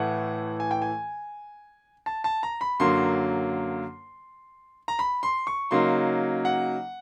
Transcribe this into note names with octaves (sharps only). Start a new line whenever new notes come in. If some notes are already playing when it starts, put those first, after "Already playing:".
Already playing: A2 E3 A3 F#5
G#5
G5
G#5
A5
A5
A#5
B5
F#2 D3 F#3 A#3 C6
A#5
B5
C6
C#6
C#3 F#3 A#3 D#4 C6
F#5